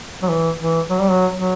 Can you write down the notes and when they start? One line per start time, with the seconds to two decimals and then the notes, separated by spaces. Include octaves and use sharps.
0.22 F#3
0.30 E3
0.60 E3
0.90 F#3
1.00 G3
1.11 F#3
1.34 F#3